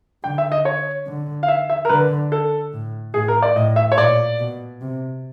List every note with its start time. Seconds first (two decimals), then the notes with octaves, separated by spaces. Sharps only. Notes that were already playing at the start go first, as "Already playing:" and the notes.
0.24 D3 G5
0.38 E5
0.52 D#5
0.65 C#5
1.07 D3
1.43 F5
1.48 E5
1.70 E5
1.85 A#4
1.89 D3 B4
2.32 A4
2.73 A2
3.14 A2 G#4
3.28 A#4
3.42 D5
3.56 A2 D#5
3.76 E5
3.92 C#5
3.98 A#2 D5
4.39 B2
4.81 C3